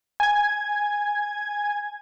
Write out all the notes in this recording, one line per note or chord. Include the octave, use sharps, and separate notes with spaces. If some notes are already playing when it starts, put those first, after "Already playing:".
G#5 G#6